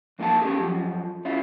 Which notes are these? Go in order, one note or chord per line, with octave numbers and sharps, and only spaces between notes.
F2 A#3 D#4 F4 F5 A5
C#4 G4 G#4
F#2 F3
C#4 E4 F4